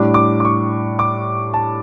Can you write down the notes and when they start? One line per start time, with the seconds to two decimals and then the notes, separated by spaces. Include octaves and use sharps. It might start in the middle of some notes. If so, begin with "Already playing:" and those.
Already playing: A2 G3 D4 D6
0.14 D6
0.40 D6
0.45 C#6
0.99 D6
1.54 A5